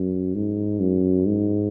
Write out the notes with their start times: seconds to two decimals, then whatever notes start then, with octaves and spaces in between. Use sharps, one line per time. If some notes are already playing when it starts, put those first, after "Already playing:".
Already playing: F#2
0.35 G#2
0.80 F#2
1.27 G#2